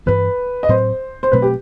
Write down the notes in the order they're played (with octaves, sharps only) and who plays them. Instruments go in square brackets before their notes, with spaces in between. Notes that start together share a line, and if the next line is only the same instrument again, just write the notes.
[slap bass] G2 E3 B3 [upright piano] B4
[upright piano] D#5
[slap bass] A2 F#3 C4 [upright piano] C5
[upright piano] C5
[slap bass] B2 F#3 A3 C4 [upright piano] B4
[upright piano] G4